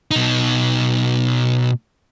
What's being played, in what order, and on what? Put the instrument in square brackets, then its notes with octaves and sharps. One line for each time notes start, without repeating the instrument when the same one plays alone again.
[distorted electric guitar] B2 D#4